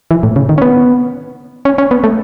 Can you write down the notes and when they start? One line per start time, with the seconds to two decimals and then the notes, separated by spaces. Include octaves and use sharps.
0.11 E3
0.23 A2
0.36 C#3
0.49 D#3
0.58 C#4
0.62 B3
1.65 C#4
1.78 C#4
1.91 B3
2.04 A3